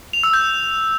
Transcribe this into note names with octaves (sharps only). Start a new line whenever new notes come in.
F7
E6
G6